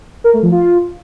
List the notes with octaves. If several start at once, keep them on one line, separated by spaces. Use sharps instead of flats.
A#4
A3
F3
F4